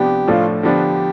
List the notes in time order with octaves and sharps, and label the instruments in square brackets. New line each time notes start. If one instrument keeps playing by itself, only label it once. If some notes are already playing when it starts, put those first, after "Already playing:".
Already playing: [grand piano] C3 F3 B3 D4 [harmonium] G4
[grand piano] A2 F3 A3 D4 [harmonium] F4
[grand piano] D3 F3 B3 D4 [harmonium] G4